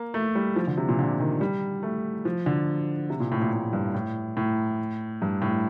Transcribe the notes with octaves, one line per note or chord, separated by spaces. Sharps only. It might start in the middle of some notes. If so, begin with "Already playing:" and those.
Already playing: A#3
A3
G3
F3
D3
C3
A#2
D3
D#3
G3
A3
F3
D3
C3
A#2
A2
A#2
A2
G2
A2
A2
G2
A2